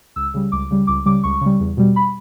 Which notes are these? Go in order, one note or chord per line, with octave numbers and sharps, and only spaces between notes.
C#2 E6
C#3 G3
C#2 D6
C#3 G3
C#2 D6
C#3 G3 D6
C#2 C#6
C#3 G3
E2
B2 G3
B5